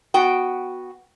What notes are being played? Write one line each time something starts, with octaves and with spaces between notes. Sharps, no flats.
B3 F#4 G5